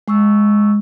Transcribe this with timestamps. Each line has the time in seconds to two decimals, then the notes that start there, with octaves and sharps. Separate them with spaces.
0.08 G#3 C#6 E6